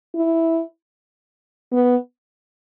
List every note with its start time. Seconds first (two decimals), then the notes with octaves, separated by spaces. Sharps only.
0.15 E4
1.72 B3